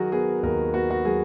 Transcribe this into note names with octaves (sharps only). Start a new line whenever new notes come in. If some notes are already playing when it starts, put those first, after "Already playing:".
Already playing: D#3 F#3 F#4 G#4 A#4
B3 G#4
D#2 A#4
B3 F#4
F#4
F#3 G#4